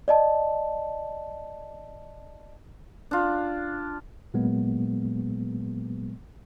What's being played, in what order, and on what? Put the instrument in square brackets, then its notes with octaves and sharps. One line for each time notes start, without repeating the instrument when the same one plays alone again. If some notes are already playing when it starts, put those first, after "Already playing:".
[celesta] D5 D#5 A5
[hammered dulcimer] D4 F4
[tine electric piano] A#2 F#3 G#3 A#3 B3